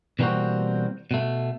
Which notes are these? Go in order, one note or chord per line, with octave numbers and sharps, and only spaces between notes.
B2 E3 G3 A#3 C4 F#4
B2 A3